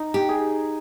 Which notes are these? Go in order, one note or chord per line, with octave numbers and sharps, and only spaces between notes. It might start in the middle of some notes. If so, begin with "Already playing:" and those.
Already playing: D#4
G4
G#4